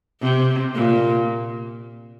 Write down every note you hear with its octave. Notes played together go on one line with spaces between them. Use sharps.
C3
A#2